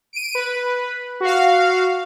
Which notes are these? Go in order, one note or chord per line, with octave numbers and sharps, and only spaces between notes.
D7 D#7
B4
F#4 F5